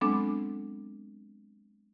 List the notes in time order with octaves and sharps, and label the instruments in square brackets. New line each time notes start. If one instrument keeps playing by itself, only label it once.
[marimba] F#3 G#3 B3 C4 D4 A4